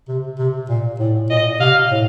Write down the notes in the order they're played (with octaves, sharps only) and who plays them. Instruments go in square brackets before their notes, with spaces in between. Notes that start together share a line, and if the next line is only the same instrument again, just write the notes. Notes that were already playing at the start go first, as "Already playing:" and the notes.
[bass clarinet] C3
C3
A#2
A2
[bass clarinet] A#2 [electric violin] D#5
[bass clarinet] C3 [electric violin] F5
[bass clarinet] A2